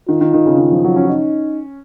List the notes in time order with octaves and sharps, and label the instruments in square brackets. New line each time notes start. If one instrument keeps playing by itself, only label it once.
[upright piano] D#3 [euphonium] F4
[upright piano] D#3
D#3
C#3
D#3
F3
F#3
C#4
[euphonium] D#4